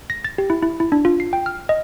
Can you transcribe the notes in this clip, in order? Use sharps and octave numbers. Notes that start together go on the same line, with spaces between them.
A#6
A6
G4
E4
E4
E4
D4
F4
C7
G5
F6
D#5